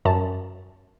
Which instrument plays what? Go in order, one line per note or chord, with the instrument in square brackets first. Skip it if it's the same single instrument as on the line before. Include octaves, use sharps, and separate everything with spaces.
[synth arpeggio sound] F#2 A5